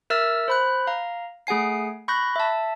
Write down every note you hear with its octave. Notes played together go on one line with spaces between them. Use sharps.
A#4 E5 E6 F6 A6
C5 B5 F#6
F5 A#5
A3 G#4 F#5 G#5 C7
B5 C#6 F#6 G6 A#6
E5 A5